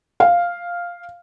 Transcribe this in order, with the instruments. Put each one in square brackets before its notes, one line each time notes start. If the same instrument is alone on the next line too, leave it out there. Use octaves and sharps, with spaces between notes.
[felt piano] F5